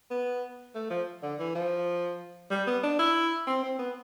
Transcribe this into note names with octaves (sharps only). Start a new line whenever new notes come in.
B3
A3
F3
D3
E3
F3
G3
B3
D4
E4
C4
C4
B3